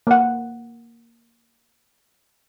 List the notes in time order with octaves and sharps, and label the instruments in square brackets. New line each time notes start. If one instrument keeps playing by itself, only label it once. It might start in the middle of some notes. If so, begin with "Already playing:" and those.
[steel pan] A#3 F#5